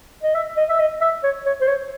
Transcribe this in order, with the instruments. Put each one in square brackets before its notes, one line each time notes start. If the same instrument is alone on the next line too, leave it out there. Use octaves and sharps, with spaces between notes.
[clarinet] D#5
E5
D#5
E5
D#5
E5
C#5
C#5
C5
C#5